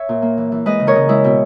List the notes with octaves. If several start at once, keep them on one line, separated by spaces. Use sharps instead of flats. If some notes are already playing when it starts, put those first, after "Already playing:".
Already playing: C#5 E5
A#2
A#3
E3
E3
G#3 B4 D#5
C#3
A#4 C#5
C#3
G#3 E4
B2